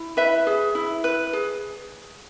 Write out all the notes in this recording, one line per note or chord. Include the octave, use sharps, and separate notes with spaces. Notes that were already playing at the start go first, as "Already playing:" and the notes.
Already playing: E4
B4 E5
G#4
E4
B4
G#4